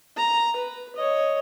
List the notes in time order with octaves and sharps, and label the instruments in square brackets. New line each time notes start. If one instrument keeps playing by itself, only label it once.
[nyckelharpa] A#5
B4
C#5 D#5